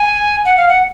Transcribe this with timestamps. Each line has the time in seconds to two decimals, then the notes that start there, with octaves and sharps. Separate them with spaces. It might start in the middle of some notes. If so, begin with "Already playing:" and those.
Already playing: G#5
0.45 F#5
0.57 F5
0.69 F#5